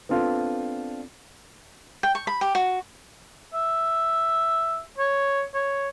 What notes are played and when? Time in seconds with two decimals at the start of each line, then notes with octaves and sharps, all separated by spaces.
0.09 B3 C4 D4 F4 A4
2.03 G5
2.15 C#6
2.27 B5
2.41 G4
2.55 F#4
3.54 E5
4.98 C#5
5.54 C#5